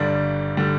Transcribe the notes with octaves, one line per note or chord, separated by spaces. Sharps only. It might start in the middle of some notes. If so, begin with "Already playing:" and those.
Already playing: G1 G2 D3 G3 D5
D3 G3